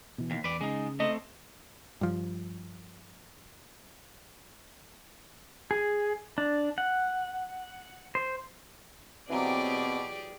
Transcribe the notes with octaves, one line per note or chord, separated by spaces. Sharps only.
B2 E3
D#2
E2 B4 D5
C#3 G#3 D#4
A3 C4 D#5
G2 F3
G#4
D4
F#5
C5
B2 E3 F#3 C4 G4 G#4 D5